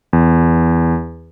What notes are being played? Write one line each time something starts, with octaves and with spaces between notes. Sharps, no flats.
E2